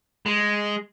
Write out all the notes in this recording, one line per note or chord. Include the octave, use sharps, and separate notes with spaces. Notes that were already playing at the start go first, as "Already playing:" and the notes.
G#3